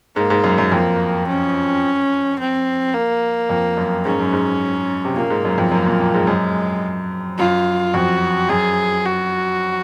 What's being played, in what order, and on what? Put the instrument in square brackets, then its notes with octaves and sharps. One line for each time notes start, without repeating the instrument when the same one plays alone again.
[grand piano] G#2 [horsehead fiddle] A#3
[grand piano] G#2
F#2
F#2
[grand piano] F2 [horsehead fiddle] A#3
[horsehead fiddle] C#4
C4
A#3
[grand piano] F2
F#2
[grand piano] G#2 [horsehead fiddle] C#4
[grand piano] F#2
G#2
C3
[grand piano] A#2 [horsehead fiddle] A#3
[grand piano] G#2
F#2
F2
[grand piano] F#2 [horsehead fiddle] A#3
[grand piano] A#2
A#2
G#2
[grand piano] F#2 [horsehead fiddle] G#3
[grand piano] F#2 [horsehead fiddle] F4
[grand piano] F2 [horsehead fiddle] F#4
[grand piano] F#2 [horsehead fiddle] G#4
[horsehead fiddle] F#4